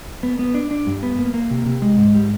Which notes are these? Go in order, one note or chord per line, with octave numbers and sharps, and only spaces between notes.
B3
B3
D4
D4
G2
B3
A#3
A#3
C3
C3
G#3
G#2
G3